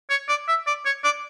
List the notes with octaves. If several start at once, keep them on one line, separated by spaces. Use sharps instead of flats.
C#5
D5
E5
D5
C#5
D5